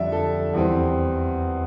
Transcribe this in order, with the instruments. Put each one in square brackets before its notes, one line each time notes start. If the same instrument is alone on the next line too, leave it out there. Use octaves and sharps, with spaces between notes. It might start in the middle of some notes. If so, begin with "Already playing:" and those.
Already playing: [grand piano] F2 D3 G3 D5 E5
A4
E2 E3 G3 C4